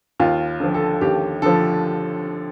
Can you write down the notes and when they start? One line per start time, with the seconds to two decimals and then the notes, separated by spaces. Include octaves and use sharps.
0.20 D#2 F4
0.60 D3 F3
0.74 A4
1.01 D#2 G4
1.42 D3 F3 A4